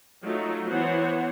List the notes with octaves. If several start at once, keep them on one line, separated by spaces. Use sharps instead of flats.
F#3 A3 D#4 F4
E3 B3 C5 C#5 F#5